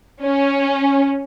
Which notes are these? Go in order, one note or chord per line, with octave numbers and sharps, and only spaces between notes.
C#4